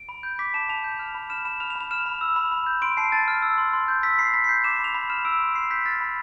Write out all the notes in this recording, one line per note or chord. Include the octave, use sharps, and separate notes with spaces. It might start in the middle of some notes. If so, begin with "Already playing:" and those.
Already playing: D7
B5
G6
D6 B6
A5 E7
A5 F7
G6
F6
B5
F6 E7
B5 E7
F6 F7
F7
B5
F7
F6 E7
B5
E6
B5
B5
G6
C6 D7
A5 C7
A5 A6
F6
E6
C6
C6
G6
E6 B6
B5 C7
B5 B6
G6 C7
D6 E7
B5 E7
F7
B5 F7
F6 E7
E6 D7
C6
C6 C7
G6 B6
F6 A6
B5